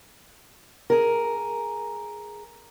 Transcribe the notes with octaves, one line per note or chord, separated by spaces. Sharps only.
G#4 A#4